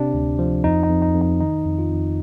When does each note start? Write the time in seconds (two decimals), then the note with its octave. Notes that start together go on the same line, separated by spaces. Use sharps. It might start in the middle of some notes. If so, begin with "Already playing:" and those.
Already playing: C3 D4
0.14 D2
0.39 F3
0.64 F2 D#4
0.83 D#4
0.90 F2
1.02 D#4
1.15 F2
1.21 D#4
1.40 D#3 D#4
1.66 F2
1.79 F4
1.91 F2